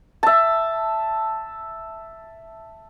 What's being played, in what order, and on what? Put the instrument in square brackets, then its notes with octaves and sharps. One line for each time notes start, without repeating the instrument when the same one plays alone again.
[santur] E5 A5